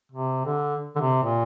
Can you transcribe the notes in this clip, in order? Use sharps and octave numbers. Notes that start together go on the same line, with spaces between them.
C3
D3
D3
C3
A#2